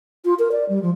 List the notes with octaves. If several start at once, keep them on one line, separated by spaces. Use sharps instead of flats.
F4
A#4
D5
G3
F3